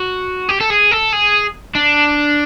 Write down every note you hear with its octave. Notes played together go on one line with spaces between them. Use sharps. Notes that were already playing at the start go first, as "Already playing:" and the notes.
Already playing: F#4
G4
A4
G#4
A4
G#4
D4